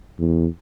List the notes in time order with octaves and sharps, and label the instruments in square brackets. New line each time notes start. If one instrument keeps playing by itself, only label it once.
[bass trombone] E2